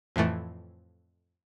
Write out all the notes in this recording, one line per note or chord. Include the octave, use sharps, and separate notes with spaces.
F2 A2 E3 A3